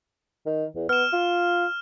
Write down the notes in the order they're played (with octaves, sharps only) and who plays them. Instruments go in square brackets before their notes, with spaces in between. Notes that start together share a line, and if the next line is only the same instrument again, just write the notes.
[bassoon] D#3
E2
[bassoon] B3 [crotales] F6 E7
[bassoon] F4